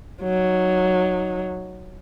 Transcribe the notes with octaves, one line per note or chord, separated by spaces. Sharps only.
F#3 D#4